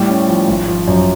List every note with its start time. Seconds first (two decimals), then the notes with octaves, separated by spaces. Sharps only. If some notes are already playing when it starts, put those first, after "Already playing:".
Already playing: A2 G3
0.08 C#4
0.28 F3
0.47 G#1
0.68 F3
0.87 F#2